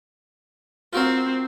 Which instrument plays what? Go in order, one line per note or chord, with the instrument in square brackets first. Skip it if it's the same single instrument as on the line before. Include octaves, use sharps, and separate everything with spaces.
[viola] C4 [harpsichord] F4 F#4 A#4